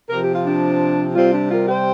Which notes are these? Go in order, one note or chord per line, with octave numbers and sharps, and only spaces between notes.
C3 F3 A#4
G4
F4
D4 G4
C3 G3 C4 F4
D4 G4
F4 A#4
G4 C5